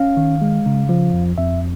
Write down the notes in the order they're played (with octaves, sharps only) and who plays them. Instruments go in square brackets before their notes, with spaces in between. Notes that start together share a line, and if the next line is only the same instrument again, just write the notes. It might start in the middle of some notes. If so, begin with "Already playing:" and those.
Already playing: [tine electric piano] C#4 F5
D#3
G#3
C#3
F3
F2
F2 E5